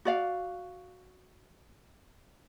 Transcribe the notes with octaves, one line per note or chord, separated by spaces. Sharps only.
F#4 D5 F5